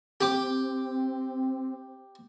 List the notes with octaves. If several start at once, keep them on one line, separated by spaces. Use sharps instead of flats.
C4 G4 D6